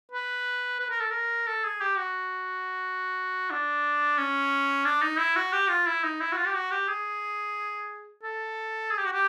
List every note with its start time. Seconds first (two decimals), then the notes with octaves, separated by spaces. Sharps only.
0.12 B4
0.80 B4
0.90 A#4
1.00 A4
1.11 A#4
1.47 A4
1.64 G#4
1.81 G4
1.98 F#4
3.51 D4
4.18 C#4
4.85 D4
5.02 D#4
5.19 E4
5.36 F#4
5.53 G4
5.69 F4
5.87 E4
6.04 D#4
6.21 E4
6.32 F#4
6.37 F4
6.46 G4
6.55 F#4
6.71 G4
6.88 G#4
8.23 A4
8.91 G#4
8.98 G4
9.05 F#4
9.13 G4